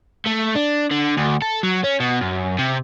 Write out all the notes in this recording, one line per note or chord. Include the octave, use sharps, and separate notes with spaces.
A3
D4
D3
D2
A4
F#3
C#4
B2
F#2
C3